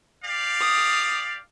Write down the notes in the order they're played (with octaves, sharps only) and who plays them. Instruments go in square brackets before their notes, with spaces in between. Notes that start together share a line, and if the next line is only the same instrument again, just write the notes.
[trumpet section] G4 D5 F5
[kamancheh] D#6